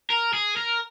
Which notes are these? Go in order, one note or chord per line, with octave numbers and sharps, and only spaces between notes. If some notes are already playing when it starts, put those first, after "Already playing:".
A#4
G#4
A#4